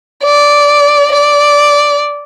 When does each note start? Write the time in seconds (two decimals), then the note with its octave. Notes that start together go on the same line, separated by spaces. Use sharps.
0.24 D5
1.13 D5